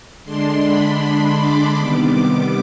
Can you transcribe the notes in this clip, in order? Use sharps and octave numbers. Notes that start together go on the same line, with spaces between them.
D3 G#3 D4 C6
B5
C6
D6
C3 D#3 G3 B3 D6
D6